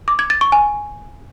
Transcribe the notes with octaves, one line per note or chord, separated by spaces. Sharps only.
D6
G#6
A6
C#6
G#5